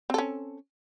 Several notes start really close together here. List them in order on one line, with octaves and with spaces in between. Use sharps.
C4 A4 C#4